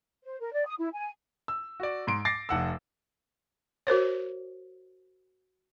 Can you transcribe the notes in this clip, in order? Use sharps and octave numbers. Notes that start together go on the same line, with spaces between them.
C5
A#4
D5
D#6
E4
G#5
E6
F#4 D5
G#2 C6 D7
D6 A6 A#6 C7
F1 F#5 E6
F#4 A#4 C5 C#5